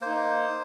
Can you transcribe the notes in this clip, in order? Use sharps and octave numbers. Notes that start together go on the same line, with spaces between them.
A#3 D#4 C5